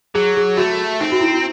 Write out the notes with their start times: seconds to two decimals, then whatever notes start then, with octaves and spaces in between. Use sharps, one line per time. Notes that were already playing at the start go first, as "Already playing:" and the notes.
0.15 F#3 G#4
0.37 G#4
0.57 A3 F#4
1.00 C4 D#4
1.12 F#4
1.21 E4